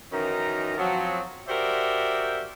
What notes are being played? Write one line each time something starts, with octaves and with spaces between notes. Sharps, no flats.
F#2 D#3 E3 C#4 D#4 A#5
F3 F#3 C4
F#4 G4 A#4 C5 D5 E5